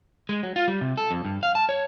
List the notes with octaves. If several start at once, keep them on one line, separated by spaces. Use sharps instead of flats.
G#3
F#3
F4
G3
C3
A4
F2
G2
F5
A5
C#5